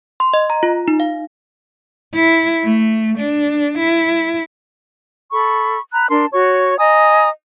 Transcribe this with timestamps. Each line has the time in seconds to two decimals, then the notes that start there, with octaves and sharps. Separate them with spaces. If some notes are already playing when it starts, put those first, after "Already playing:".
0.20 C6
0.34 D#5
0.50 A#5
0.63 F4
0.88 D#4
1.00 F5
2.14 E4
2.64 A3
3.19 D4
3.79 E4
5.32 A4 B5 C#6
5.93 A#5 B5 F#6
6.10 D4 A#4 A5 C6
6.33 F#4 C#5 C#6
6.78 D#5 G#5 A#5 D#6